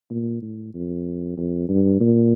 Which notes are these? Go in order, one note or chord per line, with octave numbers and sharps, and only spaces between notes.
A#2
A2
F2
F2
G2
A#2